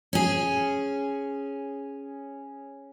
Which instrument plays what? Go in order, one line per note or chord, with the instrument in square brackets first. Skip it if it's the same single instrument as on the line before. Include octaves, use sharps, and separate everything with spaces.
[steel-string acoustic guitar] C#4 G#4